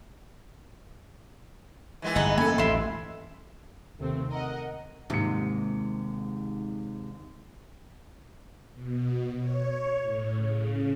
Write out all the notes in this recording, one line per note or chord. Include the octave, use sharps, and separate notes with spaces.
E3 G#3 B3
G1 D#4 B4 D#5 F#5
F2 A#3 C#4 A4 G#5 B5
A1 D2 G2 E5 C6
D#2 C3 A3 C4
A#4 D#5 F#5
D#2 G#2 C3 C#7
B2
C#5
A2
C#3